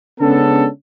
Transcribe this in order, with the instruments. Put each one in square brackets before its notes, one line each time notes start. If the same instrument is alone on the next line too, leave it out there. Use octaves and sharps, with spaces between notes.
[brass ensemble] C#3 G#3 B3 C#4 D4 A4